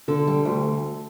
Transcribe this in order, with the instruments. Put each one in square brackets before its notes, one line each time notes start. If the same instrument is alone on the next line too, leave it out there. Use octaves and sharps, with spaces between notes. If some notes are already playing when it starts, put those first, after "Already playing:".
[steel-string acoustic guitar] D3 A4
G3
D2